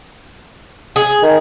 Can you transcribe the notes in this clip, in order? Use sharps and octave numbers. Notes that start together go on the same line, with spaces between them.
G#4
D#3